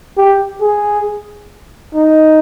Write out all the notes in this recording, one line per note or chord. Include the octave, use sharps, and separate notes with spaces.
G4
G#4
D#4